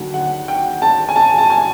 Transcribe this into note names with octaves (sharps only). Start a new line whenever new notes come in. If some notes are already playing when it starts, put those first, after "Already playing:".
Already playing: D#2 D3 F#3
F#5
G5
A5
G#5
A5
A5
G#5